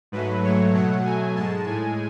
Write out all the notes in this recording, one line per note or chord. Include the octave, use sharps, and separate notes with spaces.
G#2 F#3 A3 B4
G#2 F#3 A3 C#5
B2 F#3 A3 F#5
B2 F#3 A3 G#5
G#2 G#3 A5
A2 G#3 G#5